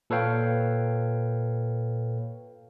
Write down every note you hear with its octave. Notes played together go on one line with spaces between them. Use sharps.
A#2 A4 B4 C#5 F5 G5